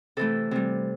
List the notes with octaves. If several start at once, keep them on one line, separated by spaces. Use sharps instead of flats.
C3 E3 A3 A4
C3 G3